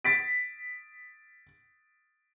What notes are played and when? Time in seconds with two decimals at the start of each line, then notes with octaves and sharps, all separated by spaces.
0.05 A6 B6 D7